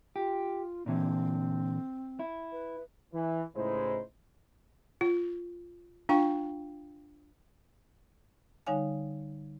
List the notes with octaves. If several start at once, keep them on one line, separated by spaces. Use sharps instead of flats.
F4 G4
A#2 D3 E3 C4
E4
B4
E3
C#2 A2 G#3 D#4 E4 C5
F4
D4 F4 F5 G5 C#6
D3 G3 D#4 C#5 F5 G#5